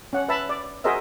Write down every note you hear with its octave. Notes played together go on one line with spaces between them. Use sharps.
C#4 F#5
B4 E5 A5 B5
D5
F#4 G#4 A#4 C5 D#5 E5